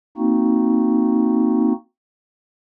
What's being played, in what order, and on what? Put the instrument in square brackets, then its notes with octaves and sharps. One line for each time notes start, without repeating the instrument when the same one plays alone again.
[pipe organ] A#3 C4 D#4 F#4